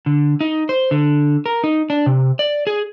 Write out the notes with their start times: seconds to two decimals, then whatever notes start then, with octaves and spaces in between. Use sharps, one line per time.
0.06 D3
0.41 D#4
0.69 C5
0.91 D3
1.46 A#4
1.64 D#4
1.90 D4
2.06 C3
2.39 D5
2.67 G#4